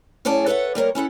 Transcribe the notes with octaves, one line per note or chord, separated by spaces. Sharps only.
F#2 A2 C#4 G#4 D5 A5
A4 B4 C#5 E5 F#5
G3 A#3 A#4 C#5
C#4 E4 A4 F#5